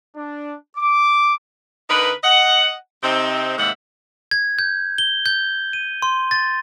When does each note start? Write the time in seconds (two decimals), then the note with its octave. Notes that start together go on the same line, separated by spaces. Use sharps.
0.16 D4
0.77 D6
1.89 D3 D#4 A#4 B4
2.24 D#5 F#5
3.03 C3 C4 D#4
3.58 D#2 G#2 C3 G#3 E5 F#5
4.31 G#6
4.59 G6
4.98 G7
5.26 G6
5.73 D#7
6.02 C6
6.31 A6